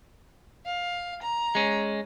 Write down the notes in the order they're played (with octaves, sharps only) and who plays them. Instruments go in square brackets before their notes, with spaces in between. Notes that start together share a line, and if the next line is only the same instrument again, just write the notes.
[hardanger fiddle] F5
A#5
[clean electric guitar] G#3 C#4